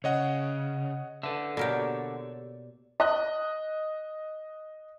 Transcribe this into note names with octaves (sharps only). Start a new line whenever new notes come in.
C#3 C#5 D#5 F#5
D3 A4 B4 E5
B2 A#3 G4 A4 C#5 D5
D#5 F#6